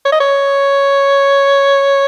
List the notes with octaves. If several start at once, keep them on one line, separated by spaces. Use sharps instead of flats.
C#5
D#5
C#5